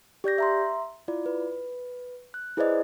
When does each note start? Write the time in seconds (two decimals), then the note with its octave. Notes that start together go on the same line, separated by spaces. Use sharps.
0.24 G4 D5 G6 A#6
0.38 E5 A#5 C6
1.08 E4 F4 D5
1.26 B4
2.34 F#6
2.57 E4 G#4 B4 C5 D5 D#5